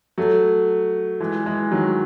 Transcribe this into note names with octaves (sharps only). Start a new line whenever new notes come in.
F#3 A3
E3 G#3
E3 G#3
D#3 F#3